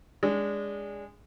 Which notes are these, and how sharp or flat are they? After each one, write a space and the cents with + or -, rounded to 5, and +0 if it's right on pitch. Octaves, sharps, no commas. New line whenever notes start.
G#3 -15 D4 -25